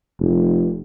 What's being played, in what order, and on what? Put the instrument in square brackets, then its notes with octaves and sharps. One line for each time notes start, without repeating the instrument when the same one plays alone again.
[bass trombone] F1